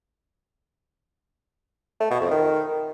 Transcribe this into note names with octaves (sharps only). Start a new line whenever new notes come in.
A3
B2
F2
D#3